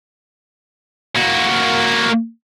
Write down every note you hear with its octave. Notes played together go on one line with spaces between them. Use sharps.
A#3 F#4